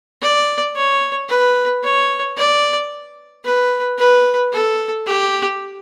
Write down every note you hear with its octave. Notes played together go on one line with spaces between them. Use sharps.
D5
C#5
B4
C#5
D5
B4
B4
A4
G4